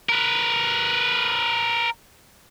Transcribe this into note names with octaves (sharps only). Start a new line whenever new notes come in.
A#4 B4